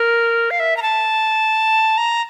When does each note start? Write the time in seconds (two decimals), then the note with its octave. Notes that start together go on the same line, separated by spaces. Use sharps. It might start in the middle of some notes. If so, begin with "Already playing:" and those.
Already playing: A#4
0.51 F5
0.60 E5
0.77 A#5
0.82 A5
1.98 A#5